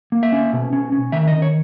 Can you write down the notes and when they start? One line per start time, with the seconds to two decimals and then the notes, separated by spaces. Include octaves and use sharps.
0.12 A#3
0.23 E5
0.32 C#4
0.53 B2
0.73 C#4
0.92 C#4
1.12 D#3 E5
1.27 D#5
1.32 D#3
1.42 C#5